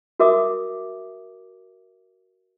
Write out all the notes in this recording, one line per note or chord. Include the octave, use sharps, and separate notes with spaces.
F#4 A#4 E5 D6 D#6